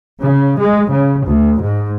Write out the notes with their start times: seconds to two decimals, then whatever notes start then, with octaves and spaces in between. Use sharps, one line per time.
0.21 C#3
0.58 G#3
0.91 C#3
1.26 D2
1.61 G#2